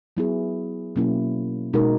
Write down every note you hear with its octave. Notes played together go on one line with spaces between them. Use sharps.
F#3 B3 E4 G#4
B2 F#3 A#3 C#4 E4
B2 G#3 D#4 F#4 A#4